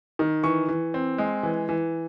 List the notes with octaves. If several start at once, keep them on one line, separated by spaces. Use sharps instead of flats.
D#3
E3 C#6
E3
C4
G#3
E3
E3